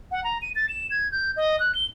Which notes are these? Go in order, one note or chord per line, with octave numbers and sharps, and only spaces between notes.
F#5
A#5
D#7
A6
E7
G#6
G6
D#5
F#6
G7